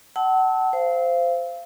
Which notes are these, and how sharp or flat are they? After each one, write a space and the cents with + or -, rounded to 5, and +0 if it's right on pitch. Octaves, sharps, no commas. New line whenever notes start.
F#5 +30 A5 +0 E6 -30
C5 -10 F5 -25